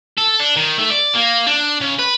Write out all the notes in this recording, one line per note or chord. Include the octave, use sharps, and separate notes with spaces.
A4
D4
D#3
A3
D5
A#3
D4
C#3
B4